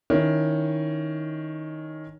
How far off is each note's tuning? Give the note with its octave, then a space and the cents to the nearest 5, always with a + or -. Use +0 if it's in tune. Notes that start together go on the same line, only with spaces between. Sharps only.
D#3 +5 C#4 +5 E4 +0